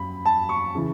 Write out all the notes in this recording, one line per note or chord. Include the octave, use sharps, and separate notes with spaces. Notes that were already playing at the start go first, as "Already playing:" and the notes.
Already playing: F#2 F#3 B5
A5
C#6
C#3 E3